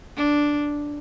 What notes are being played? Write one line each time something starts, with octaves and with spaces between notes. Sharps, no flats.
D4